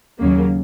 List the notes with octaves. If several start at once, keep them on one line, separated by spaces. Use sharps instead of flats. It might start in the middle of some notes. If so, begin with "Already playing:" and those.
D#2 C#3 F#3 A#3